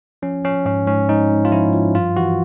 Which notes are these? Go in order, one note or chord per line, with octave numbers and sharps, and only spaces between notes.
F3 C#4
F3 C#4
G#2 C#4
G#2 C#4
G#2 D#4
G#2
F4
F3 E4
F3
G2 F4
E3 F#4